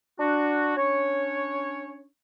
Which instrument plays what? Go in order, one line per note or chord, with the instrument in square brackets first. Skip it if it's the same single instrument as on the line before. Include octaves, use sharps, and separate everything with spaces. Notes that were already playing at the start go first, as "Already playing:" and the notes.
[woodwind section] D4 F#4
C#4 D4 C#5